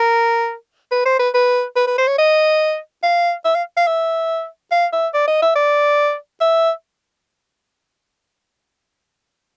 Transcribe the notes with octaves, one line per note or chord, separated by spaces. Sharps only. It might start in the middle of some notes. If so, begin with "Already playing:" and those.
Already playing: A#4
B4
C5
B4
B4
B4
B4
C5
C#5
D#5
F5
E5
F5
F5
E5
F5
E5
D5
D#5
E5
D5
E5